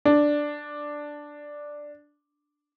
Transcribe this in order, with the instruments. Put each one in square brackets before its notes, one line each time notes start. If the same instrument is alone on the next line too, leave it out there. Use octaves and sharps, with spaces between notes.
[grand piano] D4